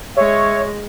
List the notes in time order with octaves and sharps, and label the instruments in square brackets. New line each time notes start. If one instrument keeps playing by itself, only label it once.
[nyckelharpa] G#3 [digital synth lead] C#5 [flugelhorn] E5